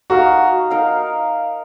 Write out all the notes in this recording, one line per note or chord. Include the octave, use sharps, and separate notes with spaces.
D#4 F#4 A#4 F5
D#4 A#4 F5